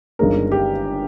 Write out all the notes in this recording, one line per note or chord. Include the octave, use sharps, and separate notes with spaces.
G1 G2 D#3 G#3 C#4 A#4
G4